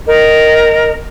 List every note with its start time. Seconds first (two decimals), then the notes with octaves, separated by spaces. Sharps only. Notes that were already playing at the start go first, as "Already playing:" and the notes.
0.06 A#4 D#5